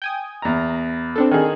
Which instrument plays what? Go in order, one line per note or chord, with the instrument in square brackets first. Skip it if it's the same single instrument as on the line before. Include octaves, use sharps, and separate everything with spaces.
[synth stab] G5 G#5 D#6
[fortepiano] E2 A#5
[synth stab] C4 D4 A4
[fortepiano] D#3 G#4